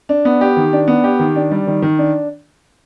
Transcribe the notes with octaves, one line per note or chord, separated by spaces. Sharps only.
D4
B3
G4
D#3
D4
B3
G4
D#3
D4
G3
D#3
D#3
D4